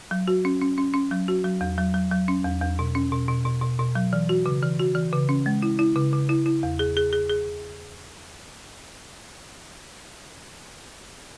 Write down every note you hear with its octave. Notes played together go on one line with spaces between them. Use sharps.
F#3
F#4
C#4
C#4
C#4
C#4
F#3
F#4
F#3
E2
F#3
F#3
F#3
C#4
E2
E2
B2
C#4
B2
B2
B2
B2
B2
F#3
E3
F#4
C#3
E3
F#4
E3
C#3
C#4
G#3
E4
E4
C#3
C#3
E4
E4
E2
G#4
G#4
G#4
G#4